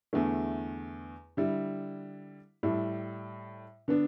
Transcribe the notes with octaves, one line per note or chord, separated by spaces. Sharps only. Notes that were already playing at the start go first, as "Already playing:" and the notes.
E2 D3 A3 E4
D3 G3 E4
A2 G3 E4
D3 B3 D4